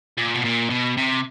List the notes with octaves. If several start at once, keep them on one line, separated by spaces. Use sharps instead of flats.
A#2
B2
A#2
B2
C3